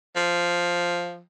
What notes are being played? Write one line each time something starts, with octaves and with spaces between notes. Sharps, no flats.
F3